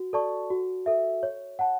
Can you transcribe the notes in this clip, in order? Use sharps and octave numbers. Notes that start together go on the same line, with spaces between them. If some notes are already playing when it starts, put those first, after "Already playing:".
Already playing: F#4
A4 D5 A5 C#6
F#4
A4 E5
C#5
F#5 A5